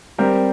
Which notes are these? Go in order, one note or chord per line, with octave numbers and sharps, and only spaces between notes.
G3 C4 G4 A#4